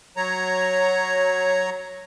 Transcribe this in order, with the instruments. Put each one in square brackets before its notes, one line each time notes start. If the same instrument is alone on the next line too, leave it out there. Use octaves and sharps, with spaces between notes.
[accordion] F#3 C#5 A#5